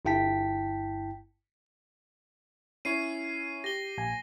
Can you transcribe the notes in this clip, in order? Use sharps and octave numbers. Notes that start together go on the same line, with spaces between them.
G1 G2 E4 G5 A5 B6
C#4 E4 C#5 C7 D#7
G4 A#6 G7
A#1 G#5